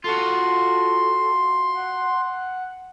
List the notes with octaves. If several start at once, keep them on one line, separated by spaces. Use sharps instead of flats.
F4 F#4 A4 C6
F#5